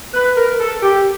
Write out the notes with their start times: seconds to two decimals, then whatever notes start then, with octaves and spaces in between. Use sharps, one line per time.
0.14 B4
0.37 A#4
0.60 A4
0.82 G4